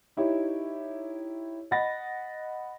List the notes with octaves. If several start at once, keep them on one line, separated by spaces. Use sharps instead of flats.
D#4 E4 G4 C#5
D#5 F#5 B5 A6 A#6